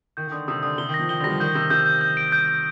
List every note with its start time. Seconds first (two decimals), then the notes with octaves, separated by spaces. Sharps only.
0.17 D#3 G6
0.27 D#3
0.32 D3 D#6
0.48 C3 D#6
0.63 D3 D#6
0.78 C3 G7
0.89 D#3
0.94 A#6
0.99 F3
1.09 D#3 G7
1.20 D3
1.24 G3 A#6
1.30 F3
1.40 D#3 G6
1.55 C3 G6
1.70 C3 G6
1.86 G6
2.01 G6
2.17 D7
2.32 G6
2.48 G6